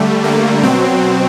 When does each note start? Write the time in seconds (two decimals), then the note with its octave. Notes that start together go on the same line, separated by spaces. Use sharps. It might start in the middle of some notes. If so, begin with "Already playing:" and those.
Already playing: D3 G3 A3
0.24 A#3
0.62 B2 F#3 C4